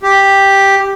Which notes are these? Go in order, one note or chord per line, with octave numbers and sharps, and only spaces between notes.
G4